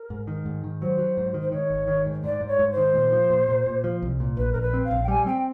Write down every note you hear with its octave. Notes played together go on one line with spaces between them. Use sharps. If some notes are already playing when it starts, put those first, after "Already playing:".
Already playing: A#4
G#2
D#3
G#2
D#3
F#3 C5
F#3
G#2
D#3
C5
D#3 C#5
G#1
D#3
G#2
G#2 D5
G#2
C#5
G#2
C5
D#3
A#2
F3
A#2
A#2
A#2
F3
C2
A#2
A#1 B4
A#1 A#4
B4
C4
F5
A#1
G5
G3 G#5
C4 G5